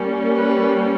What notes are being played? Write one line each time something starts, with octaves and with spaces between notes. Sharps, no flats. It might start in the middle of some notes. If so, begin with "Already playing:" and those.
Already playing: G3 A#3 C#4
B4